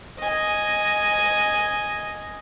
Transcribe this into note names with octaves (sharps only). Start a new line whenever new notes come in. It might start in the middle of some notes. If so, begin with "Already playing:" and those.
D#5 G#5